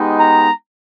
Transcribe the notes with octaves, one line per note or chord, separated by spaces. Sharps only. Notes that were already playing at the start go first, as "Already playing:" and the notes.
Already playing: G#3 B3 D#4 G4
A#5